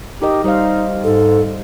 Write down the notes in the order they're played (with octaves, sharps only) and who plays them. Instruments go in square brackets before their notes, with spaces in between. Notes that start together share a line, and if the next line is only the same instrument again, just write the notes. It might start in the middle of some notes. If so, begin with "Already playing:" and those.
[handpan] D#4 A#4 D#5 [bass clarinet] G4
[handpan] G3 C5 F5 [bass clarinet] D#4
[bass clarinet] G#2 [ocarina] A4